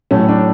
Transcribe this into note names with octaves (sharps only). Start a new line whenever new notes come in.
A2 F#3 A3 C#4
D4